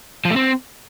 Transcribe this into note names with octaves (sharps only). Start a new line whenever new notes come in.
F3
A3
C4